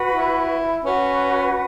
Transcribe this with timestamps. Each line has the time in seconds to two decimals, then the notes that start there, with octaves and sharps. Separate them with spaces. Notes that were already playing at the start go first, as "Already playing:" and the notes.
Already playing: F#4 B4 F#5 B5
0.13 E4
0.84 C#4 F#4 B4 F#5